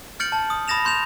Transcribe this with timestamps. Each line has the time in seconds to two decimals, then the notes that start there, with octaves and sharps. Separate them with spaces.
0.20 F6 G6 A6 C#7 D7 F#7
0.32 A5
0.50 D#6
0.68 B5 D#6 A6 A#6 E7 F7
0.85 C6 G6 E7 F7